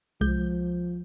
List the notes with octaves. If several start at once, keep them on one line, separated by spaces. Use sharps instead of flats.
C2 F3 G#3 G6